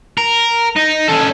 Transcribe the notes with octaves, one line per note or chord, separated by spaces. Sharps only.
A#4
D#4
C#4 A4